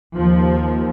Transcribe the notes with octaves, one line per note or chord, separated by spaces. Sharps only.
D#2 F3